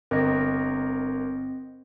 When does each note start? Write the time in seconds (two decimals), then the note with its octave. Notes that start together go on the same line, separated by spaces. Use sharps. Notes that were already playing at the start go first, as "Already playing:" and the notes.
0.11 G1 C4 A#4 D#5